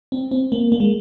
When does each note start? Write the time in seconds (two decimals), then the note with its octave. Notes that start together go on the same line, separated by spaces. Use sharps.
0.12 C4
0.31 C4
0.52 A#3
0.72 A#3
0.80 G#3